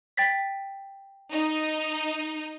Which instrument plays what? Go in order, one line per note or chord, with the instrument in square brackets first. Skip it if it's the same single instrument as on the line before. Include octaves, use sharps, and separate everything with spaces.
[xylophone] G5 A6 B6
[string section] D#4